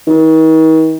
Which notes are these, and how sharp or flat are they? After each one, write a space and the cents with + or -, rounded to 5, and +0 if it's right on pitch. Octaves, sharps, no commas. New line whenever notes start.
D#3 +40